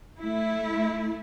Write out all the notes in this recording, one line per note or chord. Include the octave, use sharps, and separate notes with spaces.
A3 E4